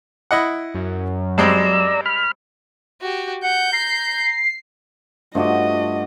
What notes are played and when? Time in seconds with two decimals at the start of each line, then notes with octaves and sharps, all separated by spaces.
0.31 E4 D#5 F#5
0.74 F#2
1.38 G3 G#3 C4 D5 A#5 E6
2.06 B5 F6
3.02 F#4 G4
3.43 F#5 G6
3.73 A#5 C7
5.35 G2 F3 A3 F#4 D#5 D6